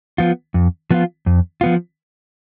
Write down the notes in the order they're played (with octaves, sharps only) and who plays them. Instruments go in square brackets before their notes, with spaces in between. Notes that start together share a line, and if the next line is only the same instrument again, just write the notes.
[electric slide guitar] F3 B3 F4
F2
F3 B3 F4
F2
F3 B3 F4